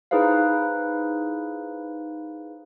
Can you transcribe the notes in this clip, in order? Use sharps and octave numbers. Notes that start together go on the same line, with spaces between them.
D#4 E4 G#4 B4 C5 F5